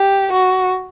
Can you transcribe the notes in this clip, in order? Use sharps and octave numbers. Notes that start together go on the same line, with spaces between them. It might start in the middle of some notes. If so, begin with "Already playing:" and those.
Already playing: G4
F#4